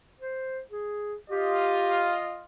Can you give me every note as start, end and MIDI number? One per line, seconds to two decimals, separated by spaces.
0.20 0.60 72
0.71 1.15 68
1.30 2.45 65
1.30 2.12 67
1.30 2.45 75